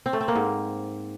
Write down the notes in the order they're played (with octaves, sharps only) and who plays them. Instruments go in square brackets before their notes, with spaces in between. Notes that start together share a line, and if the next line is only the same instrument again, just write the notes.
[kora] C4
A3
C4
A#3
G#2